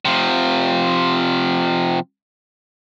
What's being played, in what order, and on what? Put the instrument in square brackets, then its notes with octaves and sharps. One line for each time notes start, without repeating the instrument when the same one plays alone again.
[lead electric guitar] C3 F3